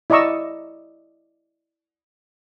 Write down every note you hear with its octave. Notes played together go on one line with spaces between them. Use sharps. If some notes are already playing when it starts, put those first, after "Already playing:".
E4 D5 D#5 A#5 C#6 E6